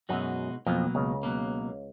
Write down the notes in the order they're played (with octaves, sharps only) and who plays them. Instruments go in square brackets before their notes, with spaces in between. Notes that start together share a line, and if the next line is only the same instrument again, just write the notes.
[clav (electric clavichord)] F#2 F#3 [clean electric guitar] B2 G#3 D#4 F#4
[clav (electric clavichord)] F2 F3 [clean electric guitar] B2 F#3 A#3
[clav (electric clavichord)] C#2 C#3
[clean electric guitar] B2 F#3 A#3